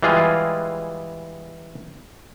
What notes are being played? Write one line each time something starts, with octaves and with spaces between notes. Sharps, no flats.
E3 G3 G#3 F4 G#4